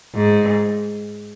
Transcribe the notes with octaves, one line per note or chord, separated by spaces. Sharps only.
G#2